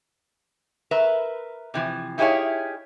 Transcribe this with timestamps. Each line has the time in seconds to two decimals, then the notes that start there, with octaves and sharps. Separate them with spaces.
0.91 A#4 B4 E5
1.74 C3 E3 F3
2.18 D#4 E4 G4 G#4 C#5 F5